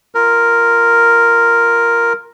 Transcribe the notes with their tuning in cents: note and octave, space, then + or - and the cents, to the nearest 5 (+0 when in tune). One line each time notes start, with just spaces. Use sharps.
F4 +0 A#4 +0